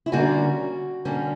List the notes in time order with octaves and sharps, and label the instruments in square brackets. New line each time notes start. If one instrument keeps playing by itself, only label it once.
[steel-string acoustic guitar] E4
D3 G3 A#3 C#4 F#4
D3 G3 A#3 C#4